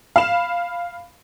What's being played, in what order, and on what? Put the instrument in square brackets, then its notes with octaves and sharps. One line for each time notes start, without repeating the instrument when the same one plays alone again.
[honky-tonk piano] F5 B5 E7